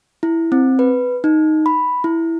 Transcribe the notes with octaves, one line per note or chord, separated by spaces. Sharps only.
E4
C4
B4
D#4
B5
E4